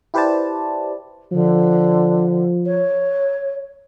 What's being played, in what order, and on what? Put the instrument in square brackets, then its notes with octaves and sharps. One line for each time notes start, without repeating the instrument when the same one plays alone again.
[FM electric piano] E4 G4 B4 C5 D5 A5
[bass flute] D3 [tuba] F3
[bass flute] C#5